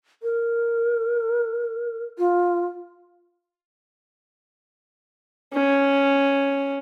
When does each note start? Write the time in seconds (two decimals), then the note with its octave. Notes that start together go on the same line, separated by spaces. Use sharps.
0.23 A#4
2.18 F4
5.53 C#4